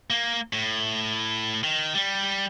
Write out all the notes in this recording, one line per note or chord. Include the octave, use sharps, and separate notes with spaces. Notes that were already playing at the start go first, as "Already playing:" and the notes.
A#3
A2
D#3
G3